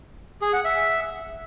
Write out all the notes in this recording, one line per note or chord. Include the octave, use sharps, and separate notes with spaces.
G#4
F#5
E5